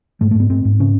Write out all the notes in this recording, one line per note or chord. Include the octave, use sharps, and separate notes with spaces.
G#2 A3
A3
G#2 B3
G#2 C4
G#2
C#3 C#4